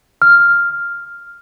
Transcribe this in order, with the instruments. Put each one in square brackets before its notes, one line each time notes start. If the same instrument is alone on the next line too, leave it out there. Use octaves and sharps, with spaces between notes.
[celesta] F6